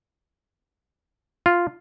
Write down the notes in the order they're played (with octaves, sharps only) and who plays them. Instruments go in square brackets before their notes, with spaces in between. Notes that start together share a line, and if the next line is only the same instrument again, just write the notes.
[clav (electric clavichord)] F4